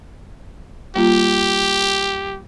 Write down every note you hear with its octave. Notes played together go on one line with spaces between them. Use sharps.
G3 A#3 F4 G4